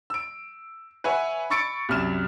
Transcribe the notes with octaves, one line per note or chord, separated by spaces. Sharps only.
E6 D7
B4 C#5 E5 F#5 G#5
B5 C#6 E6 A6 C#7 D7
C2 F#2 F6 E7